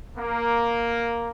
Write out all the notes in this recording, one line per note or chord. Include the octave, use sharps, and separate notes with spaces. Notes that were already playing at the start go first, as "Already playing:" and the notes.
A#3